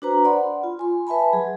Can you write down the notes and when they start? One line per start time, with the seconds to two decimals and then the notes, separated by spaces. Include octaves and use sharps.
0.02 D4 F#4 B4 C5 A#5
0.25 D5 F#5 B5 C6
0.63 F4
0.79 G#5 C6
1.07 B4 E5 G#5 A5 B5
1.33 F#3 G#4